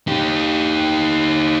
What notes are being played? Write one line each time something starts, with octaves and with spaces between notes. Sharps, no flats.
D#4 G4